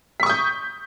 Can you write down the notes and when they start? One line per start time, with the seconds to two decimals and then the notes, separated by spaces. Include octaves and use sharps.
0.20 B6
0.23 C#6
0.26 D#6
0.30 G6